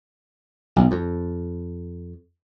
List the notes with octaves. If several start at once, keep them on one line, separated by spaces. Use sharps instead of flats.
B1
F2